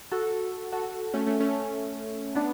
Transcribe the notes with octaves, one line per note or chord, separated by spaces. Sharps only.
F#4 A4
F#4 A4
A3 C#4
A3 C#4
A3 C#4
B3 D4